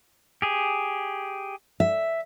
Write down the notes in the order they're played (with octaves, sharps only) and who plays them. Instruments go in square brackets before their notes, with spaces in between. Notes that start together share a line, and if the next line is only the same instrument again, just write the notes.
[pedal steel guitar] G4 G#4
[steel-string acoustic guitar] E5